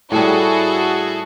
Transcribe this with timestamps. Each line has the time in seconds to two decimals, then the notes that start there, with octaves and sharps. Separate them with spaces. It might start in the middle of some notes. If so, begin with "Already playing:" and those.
0.12 A2 G3 E4 F#4 G#4 A4